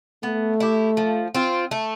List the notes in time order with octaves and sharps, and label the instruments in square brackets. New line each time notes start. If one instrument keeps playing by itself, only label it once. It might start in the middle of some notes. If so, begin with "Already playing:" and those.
[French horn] A3 [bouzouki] B3
[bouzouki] E4 G4
F3
C4 F4
A3